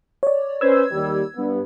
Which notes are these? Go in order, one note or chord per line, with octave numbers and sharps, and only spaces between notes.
C#5 D5
C#4 B4 C5 E6 G#6
D#2 G3
G2 B3